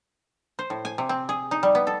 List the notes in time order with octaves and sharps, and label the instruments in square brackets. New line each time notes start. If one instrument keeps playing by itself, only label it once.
[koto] C5
A2
G#5
C3
C4
G#4
D#4
G3
B3
A4